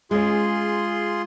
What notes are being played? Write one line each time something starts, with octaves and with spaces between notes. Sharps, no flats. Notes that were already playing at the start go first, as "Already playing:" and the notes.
G#3 C#4 F4 G#4 C6